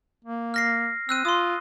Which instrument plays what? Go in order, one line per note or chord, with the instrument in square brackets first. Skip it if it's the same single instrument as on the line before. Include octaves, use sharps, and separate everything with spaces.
[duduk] A#3
[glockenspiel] F6 A#6 C7
[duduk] C4 [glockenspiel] E6 F#6 D#7
[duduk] F4 [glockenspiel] C6 D#6